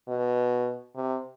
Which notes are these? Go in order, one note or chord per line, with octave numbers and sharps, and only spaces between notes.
B2
C3